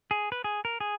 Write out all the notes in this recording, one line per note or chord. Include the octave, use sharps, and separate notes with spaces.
G#4
B4
G#4
A#4
G#4